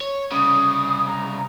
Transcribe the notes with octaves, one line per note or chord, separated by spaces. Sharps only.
C#5
C2 C#3 D#6
A#5